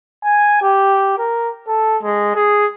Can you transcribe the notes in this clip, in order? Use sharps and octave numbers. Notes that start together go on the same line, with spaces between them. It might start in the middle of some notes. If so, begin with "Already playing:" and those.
G#5
G4
A#4
A4
G#3
G#4